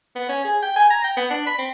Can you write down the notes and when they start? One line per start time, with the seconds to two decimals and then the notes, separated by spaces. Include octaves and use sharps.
0.15 B3
0.29 C#4
0.45 G#4
0.62 G5
0.76 G#5
0.90 A#5
1.04 G5
1.17 B3
1.30 D4
1.47 B5
1.59 C4